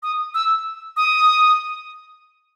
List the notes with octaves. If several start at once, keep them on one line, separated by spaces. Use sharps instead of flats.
D#6
E6
D#6